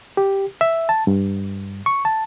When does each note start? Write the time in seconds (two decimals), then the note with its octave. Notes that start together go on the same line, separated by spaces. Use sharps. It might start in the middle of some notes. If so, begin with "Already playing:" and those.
0.17 G4
0.61 E5
0.89 A5
1.07 G2
1.86 C#6
2.05 A5